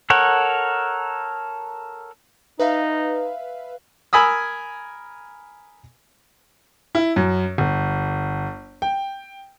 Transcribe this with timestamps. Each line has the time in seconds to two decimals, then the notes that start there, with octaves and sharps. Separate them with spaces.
0.10 A4 A#4 C#5 F#5
2.59 D#4 B4 E5 F5
4.13 A#4 G#5 B5 D#6 E6
6.95 E4
7.16 F#2
7.58 G1
8.82 G5